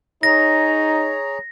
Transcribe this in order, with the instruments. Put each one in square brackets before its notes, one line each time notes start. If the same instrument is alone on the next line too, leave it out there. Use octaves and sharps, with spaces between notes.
[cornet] D#4 [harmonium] G#4 C#5 A#5 [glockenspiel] A#6